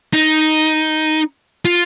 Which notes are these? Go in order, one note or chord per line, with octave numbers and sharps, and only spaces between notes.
D#4
F4